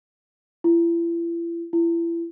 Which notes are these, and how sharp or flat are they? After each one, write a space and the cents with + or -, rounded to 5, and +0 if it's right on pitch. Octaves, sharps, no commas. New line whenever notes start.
E4 +40
E4 +35